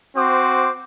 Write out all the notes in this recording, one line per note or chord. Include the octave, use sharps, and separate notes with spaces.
C4 F#4 C5 D6